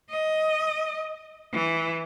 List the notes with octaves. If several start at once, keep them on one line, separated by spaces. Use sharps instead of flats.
D#5
E3